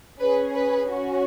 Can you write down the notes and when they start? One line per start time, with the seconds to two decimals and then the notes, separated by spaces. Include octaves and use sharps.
0.20 C#4 G#4 B4
0.55 B4
0.87 C#4 F#4